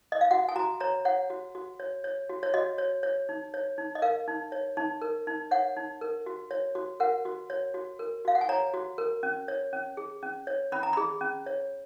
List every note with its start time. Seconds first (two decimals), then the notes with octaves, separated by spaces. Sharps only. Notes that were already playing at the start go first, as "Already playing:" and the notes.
0.12 D#5
0.21 F5
0.31 F#4 F#5
0.49 G#5
0.56 F#4 A#5
0.80 C#5 A#5
1.05 C#5 F#5
1.30 F#4
1.55 F#4
1.80 C#5
2.04 C#5
2.29 F#4
2.43 C#5
2.54 F#4 D#5
2.78 C#5
3.03 C#5
3.29 D#4
3.54 C#5
3.78 D#4
3.95 D#5
4.02 A#4 F5
4.28 D#4
4.52 C#5
4.77 D#4
5.02 A#4
5.27 D#4
5.51 C#5 F#5
5.77 D#4
6.01 A#4
6.26 F#4
6.51 C#5
6.75 F#4
7.00 A#4 F#5
7.25 F#4
7.50 C#5
7.74 F#4
7.99 A#4
8.25 F#4 F5
8.35 F#5
8.41 G#5
8.49 C#5 A#5
8.74 F#4
8.98 A#4
9.23 C#4
9.48 C#5
9.73 C#4
9.97 G#4
10.23 C#4
10.47 C#5
10.72 C#4 B5
10.83 A#5
10.93 G#4 B5
11.21 C#4
11.46 C#5